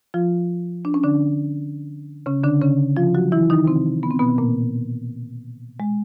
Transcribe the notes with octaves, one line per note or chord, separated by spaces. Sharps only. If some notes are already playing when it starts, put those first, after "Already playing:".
F3 F4
D4
C#4
D3 D4
C#3 C#4
D3 D4
C#3 C#4
F3 F4
F#3 F#4
E3 E4
D#3 D#4
C3 C4
B3
C4
B2 B3
A#2 A#3
G#3